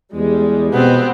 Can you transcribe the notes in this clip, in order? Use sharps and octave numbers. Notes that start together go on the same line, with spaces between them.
E2 G3 G#3
B2 B3 C4